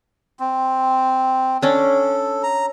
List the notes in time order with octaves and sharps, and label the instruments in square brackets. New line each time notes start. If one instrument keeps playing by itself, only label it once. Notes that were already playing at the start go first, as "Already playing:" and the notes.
[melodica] C4
[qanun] C#4 D4 [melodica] A4
[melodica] A#5